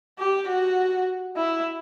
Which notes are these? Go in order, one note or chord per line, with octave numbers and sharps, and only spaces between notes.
G4
F#4
E4